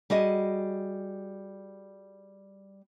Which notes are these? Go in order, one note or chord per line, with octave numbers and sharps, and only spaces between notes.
G3 F#4 G#4 D#5